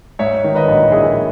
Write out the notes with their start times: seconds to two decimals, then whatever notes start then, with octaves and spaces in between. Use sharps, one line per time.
0.19 G#2 C#5 E5
0.44 D#3
0.55 B4 D#5
0.68 A#1
0.91 A#1 E4 G#4